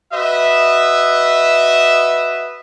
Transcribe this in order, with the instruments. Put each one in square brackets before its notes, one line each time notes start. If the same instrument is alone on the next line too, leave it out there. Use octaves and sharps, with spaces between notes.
[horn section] F#4 B4 D#5 E5